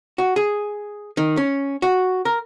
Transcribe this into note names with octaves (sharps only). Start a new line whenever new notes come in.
F#4
G#4
D#3
C#4
F#4
A#4